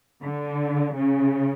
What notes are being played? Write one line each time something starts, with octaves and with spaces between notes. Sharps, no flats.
D3
C#3